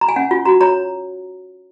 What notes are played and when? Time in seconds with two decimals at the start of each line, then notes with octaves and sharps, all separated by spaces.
0.01 A#5
0.09 G#5
0.16 C#4 F#5
0.31 F4
0.45 F#4 A#5
0.61 C#5 A#5